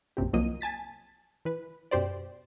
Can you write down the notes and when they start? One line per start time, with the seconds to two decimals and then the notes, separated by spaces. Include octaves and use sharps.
0.17 A#1 F#2 C3 G4
0.33 C2 F3 F#3 A#3 D#5 D#7
0.61 G#5 A5 A6 B6
1.45 E3 B4
1.91 F#2 B2 G4 C5 D5